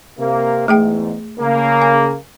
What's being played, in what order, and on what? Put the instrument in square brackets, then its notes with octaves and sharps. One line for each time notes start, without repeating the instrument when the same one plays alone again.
[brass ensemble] C3 A#3
[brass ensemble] E2 G#2 [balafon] A3 G#4 G5
[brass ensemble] C#3 A#3
[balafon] G#5